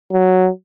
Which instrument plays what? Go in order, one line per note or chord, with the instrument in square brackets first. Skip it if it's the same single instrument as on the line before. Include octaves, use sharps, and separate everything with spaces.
[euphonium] F#3